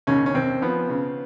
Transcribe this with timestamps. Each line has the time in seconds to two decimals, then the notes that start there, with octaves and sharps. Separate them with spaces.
0.07 D#2 C#3 C#4
0.26 C#4
0.34 D#2 C4
0.62 F3 B3
0.89 C#3